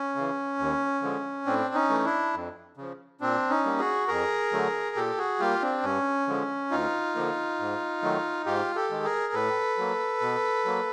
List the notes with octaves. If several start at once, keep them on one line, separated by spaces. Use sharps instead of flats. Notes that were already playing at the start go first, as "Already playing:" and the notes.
Already playing: C#4
C#3 E3
D#2
D3 F3 G#3
A2 C4 D4
C#4 D#4
E3 A3
D4 E4
F2
C#3 F3
A#2 C4 D4
C#4 D#4
G3 A#3
F#4 G#4
F2 G#4 A#4
D3 F#3 A3
A#2 G4 A4
F#4 G#4
G3 A#3 F4 G4
C4 D4
G2 C#4
D3 F3 G#3
D2 D#4 F4
D3 F3 A#3
G#2
D#3 F#3 A3
G#2 F4 G4
G4 A4
D#3 G#3
G#4 A#4
A2 A4 B4
F#3 A#3
B2
F#3 A#3